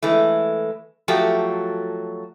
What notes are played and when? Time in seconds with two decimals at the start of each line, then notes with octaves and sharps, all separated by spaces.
0.03 E3 G#3 A3
1.08 F3 F#3 A3 F#4 G4